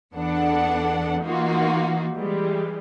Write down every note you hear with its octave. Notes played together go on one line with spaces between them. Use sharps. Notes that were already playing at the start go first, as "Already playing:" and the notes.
E2 B3 D4 A4 F#5
E3 A#3 D#4 F4 F#4
E3 G3 G#3